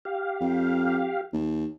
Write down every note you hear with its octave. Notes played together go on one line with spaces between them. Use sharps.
G4 F5
F2
D#2